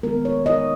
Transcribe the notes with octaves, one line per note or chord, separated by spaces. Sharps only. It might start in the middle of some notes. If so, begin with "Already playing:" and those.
D#3 G#3 B3 A#4
C#5
D#5